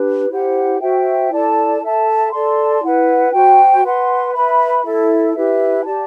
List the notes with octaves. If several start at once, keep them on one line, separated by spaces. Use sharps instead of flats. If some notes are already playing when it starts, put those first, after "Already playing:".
Already playing: D4 G4 B4
E4 G4 C5 F#5
F#4 C5 E5 G5
E4 A4 D5 A5
A4 E5 A5
A4 D5 A5 C6
E4 B4 F#5
F#4 C5 G5
B4 F#5 C6
B4 E5 B5
E4 A4 E5
E4 G4 B4 E5
G4 D5 A5